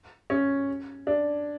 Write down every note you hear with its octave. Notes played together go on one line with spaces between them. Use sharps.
C#4
D4